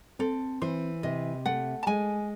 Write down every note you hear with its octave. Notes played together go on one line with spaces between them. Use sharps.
C4 A4
E3 C5
C3 D#5
A3 F#5
A5
G#3 G#5